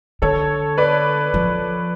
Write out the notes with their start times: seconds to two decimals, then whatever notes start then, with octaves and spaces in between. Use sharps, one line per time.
0.22 D3 A4 C#5
0.78 B4 D5
1.34 F3